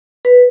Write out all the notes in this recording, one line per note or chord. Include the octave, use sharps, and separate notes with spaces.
B4